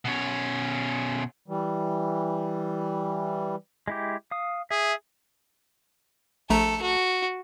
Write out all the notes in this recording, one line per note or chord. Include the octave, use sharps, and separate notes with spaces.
B2 C#4
E3 G3
G#3 E4 G4
F5 D#6
G#4 E5
A#1 A3 A4 A#5
F#4